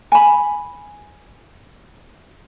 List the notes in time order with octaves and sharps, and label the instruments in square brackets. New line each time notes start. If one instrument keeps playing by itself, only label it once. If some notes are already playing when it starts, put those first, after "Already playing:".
[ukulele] G#5 B5